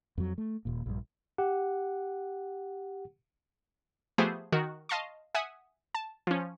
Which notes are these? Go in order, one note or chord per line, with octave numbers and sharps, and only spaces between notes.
F2 F#3
A3
D#1 A#2
A#1 G2
G4 F#5
F3 A3 B3 G4 G#4 C5
D#3 F#4 A#4
D#5 F5 A5 C6 C#6
E5 F#5 G#5 D#6
A5
F3 C#4